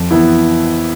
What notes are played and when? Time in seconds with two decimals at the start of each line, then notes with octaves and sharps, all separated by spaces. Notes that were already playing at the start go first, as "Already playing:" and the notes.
Already playing: F2
0.11 E3 B3 E4